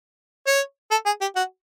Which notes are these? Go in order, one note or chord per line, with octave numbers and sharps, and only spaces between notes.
C#5
A4
G#4
G4
F#4